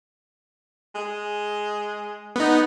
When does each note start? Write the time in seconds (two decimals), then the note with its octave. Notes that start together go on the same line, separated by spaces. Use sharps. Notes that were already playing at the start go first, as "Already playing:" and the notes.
0.95 G#3
2.36 B3 D#4